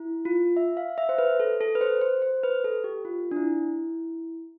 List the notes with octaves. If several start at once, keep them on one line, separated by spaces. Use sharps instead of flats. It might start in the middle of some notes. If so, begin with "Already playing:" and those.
Already playing: E4
F4
E5
F5
E5
C5
B4
A4
A4
B4
C5
C5
C5
B4
A4
G4
F4
D4
E4